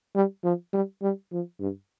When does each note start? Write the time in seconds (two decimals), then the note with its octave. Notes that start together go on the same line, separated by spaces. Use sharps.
0.16 G3
0.44 F3
0.73 G3
1.02 G3
1.32 F3
1.60 G2